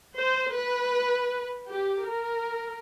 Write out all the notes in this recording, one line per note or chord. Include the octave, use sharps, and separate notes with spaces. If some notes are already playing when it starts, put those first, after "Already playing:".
C5
B4
G4
A#4